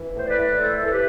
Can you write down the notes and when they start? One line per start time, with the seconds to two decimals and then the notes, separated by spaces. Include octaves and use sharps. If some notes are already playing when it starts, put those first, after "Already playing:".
Already playing: E3
0.15 A2 C5
0.26 B4 D5
0.37 A2
0.58 E3 A4 C5
0.82 E3 A4
0.91 G4 B4